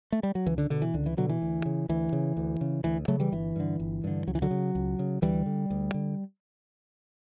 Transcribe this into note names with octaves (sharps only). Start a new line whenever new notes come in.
A3
G3
F#3
C#2 E3
D3
B2 D3
E3
C#2 D3
E3
B2 D3 F#3
E3
D2
C#3
D2 E3
C#3
D2
C#3
D2 E3
C#3 F#3 A3
E3 G3
G1 E3
G2 D3
G1
G2 D3
C#2 F#3
E3
D3 F#3
C#3
C#2
C#3
D2 E3 G3
D3
D2
D3